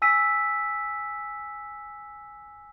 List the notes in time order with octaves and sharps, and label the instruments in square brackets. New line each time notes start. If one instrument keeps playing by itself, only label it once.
[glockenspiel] G#5 E6 B6 D#7